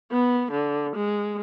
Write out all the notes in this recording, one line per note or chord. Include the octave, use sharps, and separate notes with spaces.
B3
D3
G#3